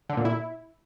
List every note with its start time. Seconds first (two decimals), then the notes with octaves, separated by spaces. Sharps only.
0.09 D3
0.17 A#2
0.25 E4